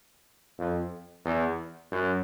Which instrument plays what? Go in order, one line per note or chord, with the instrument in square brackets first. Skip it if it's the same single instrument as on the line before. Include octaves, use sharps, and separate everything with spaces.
[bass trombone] F2
E2
F#2